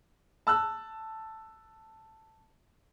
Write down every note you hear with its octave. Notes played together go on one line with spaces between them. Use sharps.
A5 E6 F#6